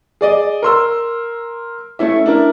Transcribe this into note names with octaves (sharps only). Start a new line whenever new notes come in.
G#4 D5 D#5
A#4 C6 E6
A3 C#4 E4 E5
D4 E4 A#4